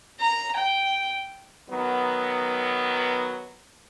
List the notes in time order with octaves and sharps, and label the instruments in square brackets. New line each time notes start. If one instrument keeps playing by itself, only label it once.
[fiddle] A#5
G5
[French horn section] D#3 F#3 B3